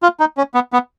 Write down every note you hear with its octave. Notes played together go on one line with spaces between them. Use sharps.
F4
D#4
C#4
B3
B3